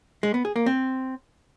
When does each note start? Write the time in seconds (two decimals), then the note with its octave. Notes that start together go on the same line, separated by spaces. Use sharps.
0.23 G#3
0.34 B3
0.45 G#4
0.56 A#3
0.66 C4